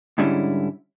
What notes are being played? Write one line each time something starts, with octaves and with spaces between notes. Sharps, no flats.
G#2 D3 G3 C#4 E4